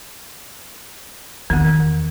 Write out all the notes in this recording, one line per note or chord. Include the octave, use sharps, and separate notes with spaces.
E2 D#3 B3